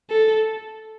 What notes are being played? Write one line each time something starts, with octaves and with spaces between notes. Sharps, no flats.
A4